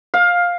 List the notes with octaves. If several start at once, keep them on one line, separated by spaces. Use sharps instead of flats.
F5